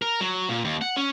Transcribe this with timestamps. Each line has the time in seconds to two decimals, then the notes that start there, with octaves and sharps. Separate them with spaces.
0.02 A#4
0.21 F#3
0.49 A#2
0.65 D#2
0.82 F#5
0.96 C#4